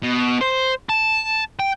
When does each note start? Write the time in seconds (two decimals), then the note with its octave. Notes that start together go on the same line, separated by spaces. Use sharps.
0.03 B2
0.41 C5
0.89 A5
1.59 G5